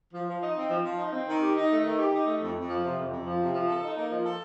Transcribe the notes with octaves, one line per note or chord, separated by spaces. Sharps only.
F3
F3
D#4
C4
F3
F3
D#4
C4
D#3
G4
D#4
A3
D#3
G4
D#4
A3
F2
F2
F3
C3
F2
F2
F3
C3
F3
A4
D#4
A#3
F3
A4